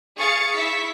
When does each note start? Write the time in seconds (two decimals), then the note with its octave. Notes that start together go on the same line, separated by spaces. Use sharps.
0.17 G#4 F5 C#6 A6 C#7
0.55 E4 E5 B6